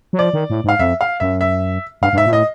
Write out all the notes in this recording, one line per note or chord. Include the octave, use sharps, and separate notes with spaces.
F#3
F3 D5
D#3
A2
G#2 F5
F2 E5
F5
F#2 E5
E5
G2 F5
G2
G#2 E5
A#2
A2 D#5